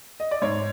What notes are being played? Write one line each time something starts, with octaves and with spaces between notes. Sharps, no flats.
D#5
D5
G#2 C#5